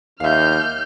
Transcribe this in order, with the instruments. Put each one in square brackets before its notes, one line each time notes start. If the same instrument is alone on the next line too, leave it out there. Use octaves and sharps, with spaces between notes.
[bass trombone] D#2 [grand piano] E5 F5 [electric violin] F6 G6